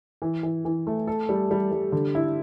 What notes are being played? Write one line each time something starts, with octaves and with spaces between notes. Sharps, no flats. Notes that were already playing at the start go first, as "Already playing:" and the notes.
E3
E3
E3
A3
A4
G3
G3
G3
D3
E4